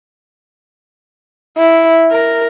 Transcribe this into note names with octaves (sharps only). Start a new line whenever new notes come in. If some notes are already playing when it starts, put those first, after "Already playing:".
E4
A#4